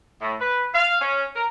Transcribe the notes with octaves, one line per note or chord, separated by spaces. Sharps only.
A2
B4
F5
C#4
A#4